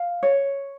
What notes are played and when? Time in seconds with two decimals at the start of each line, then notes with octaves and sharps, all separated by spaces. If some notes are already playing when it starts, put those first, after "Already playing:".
Already playing: F5
0.23 C#5